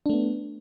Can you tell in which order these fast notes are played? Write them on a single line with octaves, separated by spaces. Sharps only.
D4 A3 B3